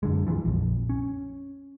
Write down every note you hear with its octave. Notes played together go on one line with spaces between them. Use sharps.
F#2 D3 G#3
C#2 G2 E3 F3
A#1 F2
C#4